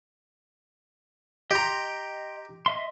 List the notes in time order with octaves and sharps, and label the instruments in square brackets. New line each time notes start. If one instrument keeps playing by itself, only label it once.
[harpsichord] G4 A#5 [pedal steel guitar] D#5 G5 C6
[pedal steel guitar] D#5 E5 C6